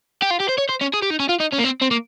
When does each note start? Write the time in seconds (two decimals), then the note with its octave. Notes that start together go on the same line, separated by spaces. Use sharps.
0.22 G4
0.30 F4
0.40 G4
0.48 C5
0.58 C#5
0.69 C5
0.81 C#4
0.93 G#4
1.02 G4
1.10 D#4
1.20 C#4
1.29 F4
1.40 D#4
1.53 C#4
1.59 A#3
1.65 C4
1.82 C4
1.91 A#3